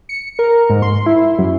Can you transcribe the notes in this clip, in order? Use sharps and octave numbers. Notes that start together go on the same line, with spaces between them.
C#7
A#4
G#2
C6
E4
F#2